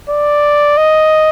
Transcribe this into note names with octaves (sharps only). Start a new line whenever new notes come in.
D5
D#5